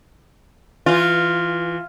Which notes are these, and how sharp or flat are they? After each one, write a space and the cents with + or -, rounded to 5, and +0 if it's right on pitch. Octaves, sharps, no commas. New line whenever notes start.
E3 +20 F4 +0